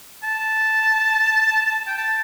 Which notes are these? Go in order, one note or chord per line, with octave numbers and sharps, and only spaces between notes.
A5
G5
A5